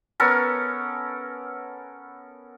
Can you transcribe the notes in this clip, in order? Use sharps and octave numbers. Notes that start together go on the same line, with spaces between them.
B3 C#4 A4 A#4